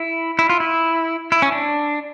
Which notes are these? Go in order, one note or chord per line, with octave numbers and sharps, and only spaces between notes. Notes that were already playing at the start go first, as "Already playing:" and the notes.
Already playing: E4
E4
F4
E4
E4
C#4
D4